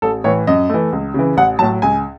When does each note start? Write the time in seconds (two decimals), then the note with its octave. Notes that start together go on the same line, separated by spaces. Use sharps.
0.02 A1 A4
0.24 A2 E3 C#5
0.47 F#2 D#5
0.69 E3 A3
0.92 C#2
1.14 C#3 E3
1.37 A1 F#5
1.59 A2 F#3 A5
1.82 C#2 G#5